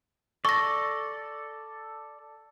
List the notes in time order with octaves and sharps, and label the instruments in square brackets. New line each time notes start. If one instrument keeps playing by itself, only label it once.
[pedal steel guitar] A4 D5 [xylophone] C#6 A#6